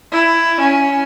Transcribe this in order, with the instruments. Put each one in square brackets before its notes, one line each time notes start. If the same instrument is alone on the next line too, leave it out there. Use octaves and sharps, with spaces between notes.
[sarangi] E4
C#4